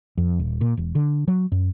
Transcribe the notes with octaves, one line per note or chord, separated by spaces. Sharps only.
F2
D#1
A#2
E1
D3
F#3
F#2